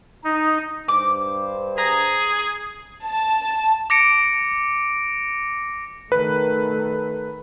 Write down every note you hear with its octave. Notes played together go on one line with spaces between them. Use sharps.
D#4
G2 C5 D6
G#4 A#5
A5
D6 A#6 C#7 D7
D#3 A3 B4